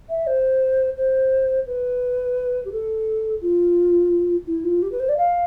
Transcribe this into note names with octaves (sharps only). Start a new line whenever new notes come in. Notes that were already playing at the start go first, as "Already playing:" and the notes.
E5
C5
C5
B4
G4
A4
F4
E4
F4
G4
B4
C5
D5
F5